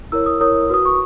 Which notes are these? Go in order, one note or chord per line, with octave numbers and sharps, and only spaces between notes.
E4 A#4 C#5 E6
D#6
E4 A#4 C#5 D#6
F#4 B4 D#6
C#6